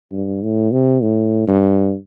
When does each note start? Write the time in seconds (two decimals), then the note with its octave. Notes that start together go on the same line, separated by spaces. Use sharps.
0.12 G2
0.43 A2
0.72 C3
1.02 A2
1.47 G2